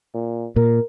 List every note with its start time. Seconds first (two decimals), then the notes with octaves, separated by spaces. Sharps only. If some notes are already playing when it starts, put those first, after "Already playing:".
0.14 A#2
0.56 A#2 A#4